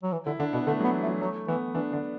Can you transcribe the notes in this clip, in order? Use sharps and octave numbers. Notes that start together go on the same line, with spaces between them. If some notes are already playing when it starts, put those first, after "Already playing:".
F#3
E3
D3 E4
D3 D4
B2 B3
D3 A3
F#3
B3
E3
A3
F#3
F#3 A3
E3 B3
E3 D4
D3 D4